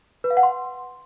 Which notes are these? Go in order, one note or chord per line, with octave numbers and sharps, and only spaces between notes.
B4
F5
F#5
C6